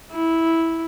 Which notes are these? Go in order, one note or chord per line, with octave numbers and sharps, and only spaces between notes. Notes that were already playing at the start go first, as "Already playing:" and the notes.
E4